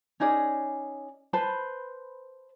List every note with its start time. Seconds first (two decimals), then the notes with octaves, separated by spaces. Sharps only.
0.20 C#4 D#4 G#4 D5
1.33 B4 C5 A5 B5